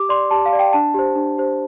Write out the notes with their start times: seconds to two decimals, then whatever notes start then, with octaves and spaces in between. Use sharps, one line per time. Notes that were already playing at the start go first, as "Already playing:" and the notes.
Already playing: G4 D6
0.09 D5 C6
0.31 G4 A5
0.46 F5
0.53 D5
0.59 G5
0.73 D4 A5
0.94 G4 C5
1.16 D4
1.38 G4 C5